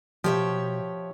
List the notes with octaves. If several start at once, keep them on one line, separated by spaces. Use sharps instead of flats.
B2 F3 G4 C#5 E5